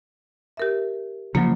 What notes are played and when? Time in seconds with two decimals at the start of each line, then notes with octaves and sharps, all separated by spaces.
0.57 G4 A#4 E5
1.35 C#3 F3 F#3 A#3